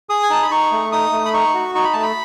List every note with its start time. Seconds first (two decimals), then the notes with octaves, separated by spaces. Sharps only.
0.09 G#4 D#6
0.23 G#5
0.30 D#4 A5
0.42 B5
0.51 D#4 C#6
0.72 A3
0.92 D#4 D#6
1.13 A3
1.25 B5
1.33 D#4 C#6
1.54 F#4
1.75 D#4 C#6
1.84 B5
1.93 A3 A5
2.02 B5